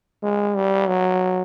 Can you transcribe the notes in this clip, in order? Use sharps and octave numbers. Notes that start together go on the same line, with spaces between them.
G#3
G3
F#3